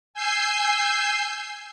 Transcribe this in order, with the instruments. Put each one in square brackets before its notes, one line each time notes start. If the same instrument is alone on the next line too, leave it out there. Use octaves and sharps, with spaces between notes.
[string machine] G#5 E6 G6 C7